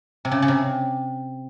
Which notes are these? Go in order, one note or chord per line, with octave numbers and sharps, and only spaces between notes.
C3
C#3
C#3
C3